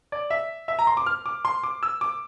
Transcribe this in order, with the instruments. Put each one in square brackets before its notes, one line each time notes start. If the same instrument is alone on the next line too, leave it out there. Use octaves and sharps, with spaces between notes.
[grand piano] D5
E5
E5
A#5
C6
D6
F6
D6
C6
D6
E6
D6